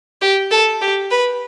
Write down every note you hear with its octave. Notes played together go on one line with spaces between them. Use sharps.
G4
A4
G4
B4